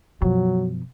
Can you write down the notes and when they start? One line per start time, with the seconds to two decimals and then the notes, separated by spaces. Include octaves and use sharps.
0.22 F#2 B2 F3 F#3